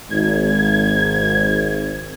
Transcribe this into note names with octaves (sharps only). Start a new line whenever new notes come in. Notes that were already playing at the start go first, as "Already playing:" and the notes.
G#1 G#6